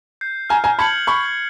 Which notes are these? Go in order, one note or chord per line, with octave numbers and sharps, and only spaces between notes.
G6 C7
G#5 A#5 F6
G#5 A#5
A5 B5 G#6 C#7 F#7
B5 C#6 F6